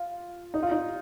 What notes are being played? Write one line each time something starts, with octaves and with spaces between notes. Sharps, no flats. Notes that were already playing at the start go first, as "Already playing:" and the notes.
Already playing: F4
D#4
F4
D#4